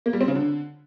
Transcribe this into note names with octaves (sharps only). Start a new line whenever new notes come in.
A#3
G3
C4
C#3
D3